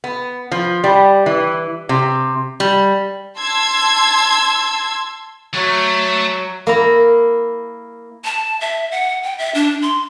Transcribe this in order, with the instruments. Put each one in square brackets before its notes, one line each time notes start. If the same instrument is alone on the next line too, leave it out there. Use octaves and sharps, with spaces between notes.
[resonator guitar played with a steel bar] B3
F3
G3
E3
C3
G3
[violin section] A5 C6 E6 G#6
[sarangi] F#3 [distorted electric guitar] A3
[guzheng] A#3 E4 A#5
[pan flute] A5
E5
F#5
G5
E5
D4
C6